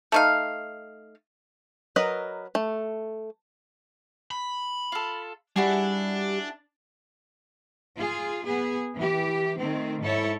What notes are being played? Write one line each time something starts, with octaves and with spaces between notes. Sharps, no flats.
A3 D#4 F5
F#3 A#4 B4 D#5 B5
A3
B5
F4 A4
G3 D4 E4 F#4 G#4
F4 G#4
B3 G#4
E3 G4
D#3 A3 C4
G#2 E4 A4 C#5